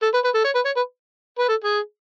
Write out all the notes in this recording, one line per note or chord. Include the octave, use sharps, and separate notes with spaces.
A4
B4
B4
A4
C#5
B4
C#5
B4
B4
A4
G#4